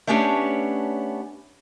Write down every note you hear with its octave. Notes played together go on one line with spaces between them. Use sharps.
A3 B3 C#4 D4 G4 C#5